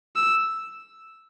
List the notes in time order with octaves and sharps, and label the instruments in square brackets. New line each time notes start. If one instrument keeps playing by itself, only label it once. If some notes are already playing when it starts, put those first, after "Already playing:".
[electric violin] E6